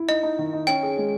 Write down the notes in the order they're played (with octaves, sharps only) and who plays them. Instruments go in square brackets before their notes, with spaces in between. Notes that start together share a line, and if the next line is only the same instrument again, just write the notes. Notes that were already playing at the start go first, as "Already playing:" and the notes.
Already playing: [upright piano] E4
[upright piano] D#4 [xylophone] D#5
[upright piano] D#4
D#3
D#4
[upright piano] C#4 [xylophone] G5
[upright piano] G#4
G#3